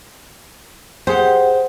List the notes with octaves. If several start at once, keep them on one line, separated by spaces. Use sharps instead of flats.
G4 G#4 C5 F#5